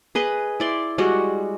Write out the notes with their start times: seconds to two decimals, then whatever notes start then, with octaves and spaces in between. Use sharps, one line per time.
0.15 G#4 B4 D#5
0.60 E4 D5 C6
0.98 G3 G#3 F#4